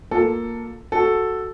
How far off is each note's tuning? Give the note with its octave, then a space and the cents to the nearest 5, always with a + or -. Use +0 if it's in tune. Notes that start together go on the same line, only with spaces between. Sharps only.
A#3 +0 F4 +20 A4 +5
F#4 +0 A4 +0